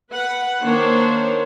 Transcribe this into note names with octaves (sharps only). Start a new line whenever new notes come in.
B4 F#5
D#3 A#3 D4 C5 C#5